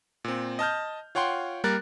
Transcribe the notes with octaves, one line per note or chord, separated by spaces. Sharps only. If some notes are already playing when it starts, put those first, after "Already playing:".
A#2 C4
D#5 A5 F6 G6
F4 C#5 F#5 G5 C6
G3 A#3 A#4 F#6 A6